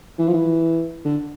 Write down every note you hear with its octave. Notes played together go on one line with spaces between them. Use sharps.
E3
F3
E3
D3